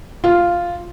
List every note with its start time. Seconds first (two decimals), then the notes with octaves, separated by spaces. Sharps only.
0.24 F4